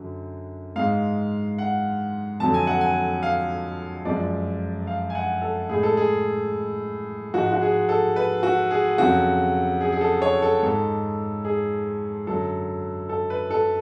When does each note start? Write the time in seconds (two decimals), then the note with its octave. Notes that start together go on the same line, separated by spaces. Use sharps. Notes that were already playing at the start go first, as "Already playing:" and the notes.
Already playing: F#2 D3 F#3
0.76 G#2 G#3 F5
1.58 F#5
2.40 F2 D3 F#3 A5
2.54 G#5
2.67 F#5
2.81 G#5
3.23 F5
4.05 F#2 F3 G#3 D5
4.87 F5
5.10 G#5
5.15 F#5
5.42 A4
5.69 A2 G#3 G#4
5.83 A4
5.97 G#4
7.34 G#2 F3 G#3 F#4
7.52 F#4
7.62 G#4
7.89 A4
8.16 B4
8.43 F#4
8.71 G#4
8.98 F2 C#3 F#3 F#4
9.81 G#4
9.92 G#4
10.01 A4
10.22 C#5
10.42 A4
10.63 G#2 G#3 A4
11.45 G#4
12.27 F#2 D3 F#3 A4
13.09 A4
13.30 B4
13.51 A4